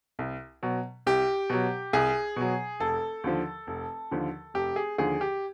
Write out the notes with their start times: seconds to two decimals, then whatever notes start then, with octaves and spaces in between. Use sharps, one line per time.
0.19 C2
0.63 B2 F#3
1.06 C2 G4
1.50 B2 F#3
1.93 C2 G#4
2.36 B2 F#3
2.80 F1 A4
3.24 D#2 D3 F3
3.67 F1
4.11 D#2 D3 F3
4.54 F1 G4
4.76 G#4
4.98 D#2 D3 F3 G#4
5.21 G4